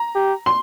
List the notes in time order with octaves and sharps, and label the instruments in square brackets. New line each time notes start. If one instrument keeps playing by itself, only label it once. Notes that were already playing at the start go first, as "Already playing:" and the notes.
Already playing: [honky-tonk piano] A#5
[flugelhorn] G4
[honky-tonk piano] C6